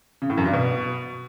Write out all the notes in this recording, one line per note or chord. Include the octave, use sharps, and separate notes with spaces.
C#3
A2
F#2
G2
B2